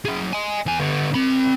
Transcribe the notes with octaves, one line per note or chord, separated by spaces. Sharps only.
F#3 G#4
D#5 G#5
E2 G#5
D3 B3
C4 B5